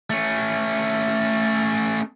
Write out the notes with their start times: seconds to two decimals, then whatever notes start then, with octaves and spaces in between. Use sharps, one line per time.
0.10 A3 C#4